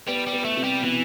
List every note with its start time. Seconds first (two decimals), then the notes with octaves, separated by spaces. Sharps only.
0.07 G3 B3
0.27 G3
0.33 B3
0.45 A3
0.57 C3
0.64 G3
0.82 B2 E3